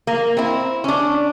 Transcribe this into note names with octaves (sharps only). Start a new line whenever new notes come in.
A#3
C4 E4
C#4 D4